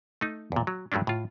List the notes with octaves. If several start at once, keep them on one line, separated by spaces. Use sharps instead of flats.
A3 D#4
E2 A#2
F#3
G2 F#3 A3 C#4 D4
A2 F4